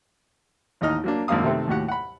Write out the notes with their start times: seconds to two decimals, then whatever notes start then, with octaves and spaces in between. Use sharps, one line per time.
0.81 A1 D#2 D#4 D#5 F6
1.04 F#3 A#3 D4
1.28 G#1 F#2 A#3 D4 F5 D#6
1.44 C3 D#3 A3 C4 A4
1.67 D#2 A2 F#4 G4 F#5
1.88 F#5 B5